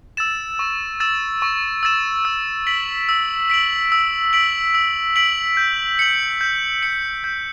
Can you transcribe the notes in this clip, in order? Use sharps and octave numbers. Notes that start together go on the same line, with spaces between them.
E6 A6 E7
C#6
E6 A6 E7
C#6
E6 A6 E7
E6
B6 D7 F#7
E6
B6 D7 F#7
E6
B6 D7 F#7
E6
B6 D7 F#7
G6
C#7 F#7
G6
C#7 F#7
G6